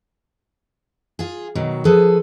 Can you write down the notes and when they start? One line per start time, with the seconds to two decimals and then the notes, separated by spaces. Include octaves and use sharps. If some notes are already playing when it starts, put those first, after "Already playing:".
1.19 F4 G#4
1.55 B2 D#3 F#3
1.85 F3 G#4 A4 B4